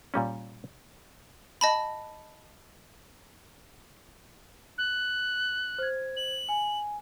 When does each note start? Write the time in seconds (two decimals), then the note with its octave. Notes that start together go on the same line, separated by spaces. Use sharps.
0.14 A#2 G3 C#4
1.61 D#5 A5 B5
4.78 F#6
5.78 C5 G#6
6.17 F#7
6.49 G#5